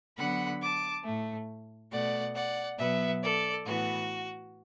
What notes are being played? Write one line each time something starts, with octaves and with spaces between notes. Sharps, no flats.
D3 F#3 B3 F#5 B5
A5 D6
A2 A3
B2 A3 D5 F#5
D5 F#5
B2 F#3 B3 B4 E5
A4 D5
A2 E3 B3 F#4